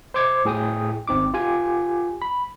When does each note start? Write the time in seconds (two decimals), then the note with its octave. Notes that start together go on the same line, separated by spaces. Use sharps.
0.14 C5 C6 D6 G#6
0.45 A2 G#4 G5 D#6
1.08 G#1 C4 D#4 D6
1.34 F4 G4 G#5
2.22 B5